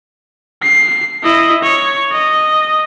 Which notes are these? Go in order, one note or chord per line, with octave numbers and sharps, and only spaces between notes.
C7
E4 D#5
C#5
D#5